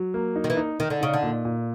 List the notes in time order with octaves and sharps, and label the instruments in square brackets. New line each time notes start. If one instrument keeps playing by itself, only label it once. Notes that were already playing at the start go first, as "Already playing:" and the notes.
Already playing: [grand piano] F#3
A#3
D#4
[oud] D#3
E3
[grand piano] D#4
[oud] D#3 [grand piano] D#4
[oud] D3
[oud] C#3 [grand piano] D#4
[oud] D3
[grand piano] A#2
A#2